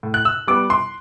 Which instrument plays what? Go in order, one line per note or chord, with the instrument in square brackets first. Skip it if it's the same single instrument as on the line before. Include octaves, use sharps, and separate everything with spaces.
[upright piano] A2
F#6
E6
G3 B3 D6
C6